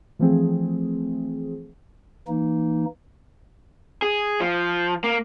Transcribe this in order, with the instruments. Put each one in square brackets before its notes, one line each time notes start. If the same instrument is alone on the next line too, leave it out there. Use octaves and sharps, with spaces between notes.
[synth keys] E3 F3 A3 C4 G#4
[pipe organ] E3 A#3 D#4
[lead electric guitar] G#4
F3
A#3